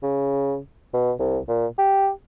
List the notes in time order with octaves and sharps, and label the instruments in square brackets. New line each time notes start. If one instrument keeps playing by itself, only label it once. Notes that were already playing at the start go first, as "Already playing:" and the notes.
[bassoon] C#3
B2
C2
A#2
G4